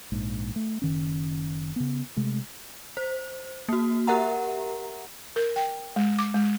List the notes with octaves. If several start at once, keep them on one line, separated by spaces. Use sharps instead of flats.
A#1 G#2
A3
F#1 D#3 C#4
C#3 B3
C3 G#3 A3
C5
A#3 F#4
G4 A#4 E5 F#5 A#5
A#4
G5
G#3
D6
G#3